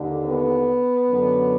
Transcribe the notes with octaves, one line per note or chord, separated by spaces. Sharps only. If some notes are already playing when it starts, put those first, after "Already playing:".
Already playing: D#2 D3
B3
F#2 D3